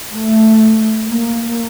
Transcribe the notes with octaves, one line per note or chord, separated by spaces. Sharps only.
A3
A#3